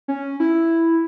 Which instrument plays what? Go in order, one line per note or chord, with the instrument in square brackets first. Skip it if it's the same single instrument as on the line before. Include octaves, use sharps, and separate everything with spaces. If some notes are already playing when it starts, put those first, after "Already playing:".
[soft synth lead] C#4
E4